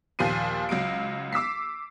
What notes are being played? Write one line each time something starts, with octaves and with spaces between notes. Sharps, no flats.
D#2 A#2 F3 C7 D#7
C#2 F#3 F5 D7
D6 E6 B6 C7